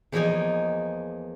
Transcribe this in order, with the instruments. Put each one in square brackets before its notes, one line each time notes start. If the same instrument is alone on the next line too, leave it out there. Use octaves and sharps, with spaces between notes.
[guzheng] E2 F3 A#3 D#4 A#4 G#5